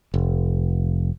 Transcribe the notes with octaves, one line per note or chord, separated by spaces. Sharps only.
F1